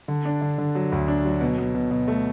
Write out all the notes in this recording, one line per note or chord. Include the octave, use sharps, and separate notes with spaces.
D3
D4
D3
D3
F#3
D2
D4
F#3
B2
B2
B2
B2
A3